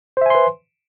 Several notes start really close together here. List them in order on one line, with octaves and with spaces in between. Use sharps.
C5 E5 G#5 C6 B4